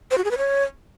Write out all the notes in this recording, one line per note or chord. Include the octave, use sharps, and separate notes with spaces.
C5
F#4
G#4
B4
C#5